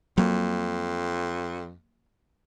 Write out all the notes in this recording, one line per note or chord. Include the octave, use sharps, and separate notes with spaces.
F2 F#3 A#3